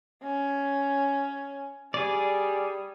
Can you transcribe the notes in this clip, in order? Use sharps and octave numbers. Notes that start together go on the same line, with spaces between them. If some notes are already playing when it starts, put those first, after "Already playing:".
C#4
G3 G#4 D5